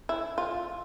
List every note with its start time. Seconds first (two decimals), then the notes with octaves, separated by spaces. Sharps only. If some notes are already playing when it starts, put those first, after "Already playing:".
0.09 E4
0.38 F4